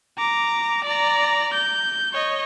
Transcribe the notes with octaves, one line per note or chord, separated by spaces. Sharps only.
A#5 D6
D5 A#5
G6
C#5 D#5